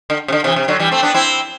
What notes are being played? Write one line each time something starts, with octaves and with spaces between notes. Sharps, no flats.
D3
C3
D3
C3 E3
C3
D3 F#3
E3 G3
A3 C4
B3 D4
C4 E4